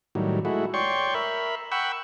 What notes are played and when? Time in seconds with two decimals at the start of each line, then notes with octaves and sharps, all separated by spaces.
0.15 A2 D#3 F#3 G3
0.45 G#3 A3 E4 F#4
0.74 C#5 D5 G5 C6 C#6
1.14 A#4 E5 B5
1.72 F#5 G5 B5 C#6 E6